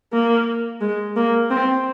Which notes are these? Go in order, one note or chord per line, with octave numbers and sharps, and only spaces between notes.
A#3
G#3
A#3
C4